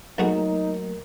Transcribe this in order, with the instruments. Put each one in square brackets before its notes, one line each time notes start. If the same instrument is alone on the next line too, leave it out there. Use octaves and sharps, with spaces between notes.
[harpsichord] B1 F#4 G#4 [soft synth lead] F#3 [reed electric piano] A3 A#3 A#4 [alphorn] D#4